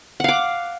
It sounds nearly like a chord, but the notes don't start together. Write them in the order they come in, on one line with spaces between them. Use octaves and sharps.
F#5 F5 D6